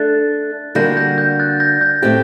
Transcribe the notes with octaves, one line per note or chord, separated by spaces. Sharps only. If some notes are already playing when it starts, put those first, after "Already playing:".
Already playing: A3 D4 A4 F#6 A6
D3 G3 A#3 D4 F#4 G6 A#6
G6 A#6
G6
F#6 A6
G6 A#6
G6 A#6
A2 A3 C4 G4